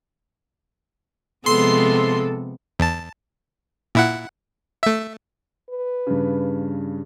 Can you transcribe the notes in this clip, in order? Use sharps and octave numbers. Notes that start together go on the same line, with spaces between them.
C3 F3 G#3 B3 A4 C6
E2 A5
A#2 E4 F#5
A3 E5
B4
G2 C#3